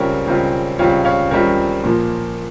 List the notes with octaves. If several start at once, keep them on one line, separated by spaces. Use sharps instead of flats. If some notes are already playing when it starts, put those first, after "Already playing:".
Already playing: C#2 C#3 G3 C4 F4 A#4 C#5
C#2 C#3 G3 C4 F4
C#2 C#3 G3 C4 F4 C#5 F5
C#5 F5
C#2 C#3 G3 C4 F4 A#4 C#5
A#2 F3 A#3